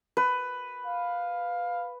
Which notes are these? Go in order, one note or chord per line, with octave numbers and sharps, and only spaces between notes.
B4
F5